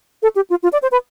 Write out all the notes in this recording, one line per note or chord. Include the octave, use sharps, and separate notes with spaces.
A4
G4
F4
F4
D5
C5
B4